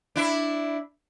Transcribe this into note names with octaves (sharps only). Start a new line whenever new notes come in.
D4 E4